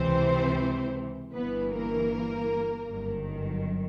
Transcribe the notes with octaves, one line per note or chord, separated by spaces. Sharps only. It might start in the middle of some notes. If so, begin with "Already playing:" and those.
Already playing: C#2 C3 E3 C4 C5
G1 G2 E3 B3 B4
A#3 A#4
G1 F#2 D#3